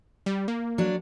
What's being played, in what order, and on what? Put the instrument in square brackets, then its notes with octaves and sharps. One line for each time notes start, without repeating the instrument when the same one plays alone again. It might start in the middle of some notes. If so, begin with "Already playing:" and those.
[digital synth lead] G3
A#3
[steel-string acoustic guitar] F#3 D4